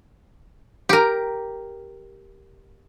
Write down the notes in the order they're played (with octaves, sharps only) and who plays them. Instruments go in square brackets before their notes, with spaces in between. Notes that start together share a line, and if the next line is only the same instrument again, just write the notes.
[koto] G4 A#4